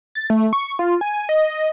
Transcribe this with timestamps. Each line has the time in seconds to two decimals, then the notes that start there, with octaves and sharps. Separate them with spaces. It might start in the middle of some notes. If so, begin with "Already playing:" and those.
0.15 A6
0.30 A3
0.53 C#6
0.79 F4
1.01 G#5
1.29 D#5